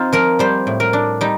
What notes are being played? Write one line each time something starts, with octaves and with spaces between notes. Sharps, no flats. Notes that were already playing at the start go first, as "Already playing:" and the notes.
Already playing: C4 D#4 F4
F3 A#4
G3 C5
A2
A#4
D4
G3 D#4